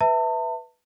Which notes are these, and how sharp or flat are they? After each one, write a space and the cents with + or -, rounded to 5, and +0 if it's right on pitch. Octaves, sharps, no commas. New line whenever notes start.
B4 +0 E5 -10 A5 +40